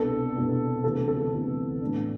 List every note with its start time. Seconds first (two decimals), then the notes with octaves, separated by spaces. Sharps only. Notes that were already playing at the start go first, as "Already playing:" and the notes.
Already playing: C2 B2 B3 D4 A4
0.35 C2 B2 B3 D4
0.83 D2 C3 E3 B3 D4 A4
1.08 A4
1.33 D2 C3 E3 B3 D4
1.81 A2 E3 B3 D4